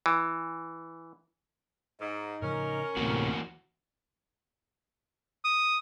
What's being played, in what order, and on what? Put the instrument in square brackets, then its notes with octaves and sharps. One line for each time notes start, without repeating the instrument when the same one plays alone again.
[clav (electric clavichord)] E3
[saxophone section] G#2 [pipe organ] D#4
[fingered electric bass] A2 C#3 F3 [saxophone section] C#4 A#4
[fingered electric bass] D2 B3 [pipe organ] A2 C3 [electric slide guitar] E3 A#3 F#4
[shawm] D#6